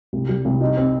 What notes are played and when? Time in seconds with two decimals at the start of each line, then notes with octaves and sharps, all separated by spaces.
0.13 C2
0.29 G3
0.45 C2
0.61 D#4
0.77 C4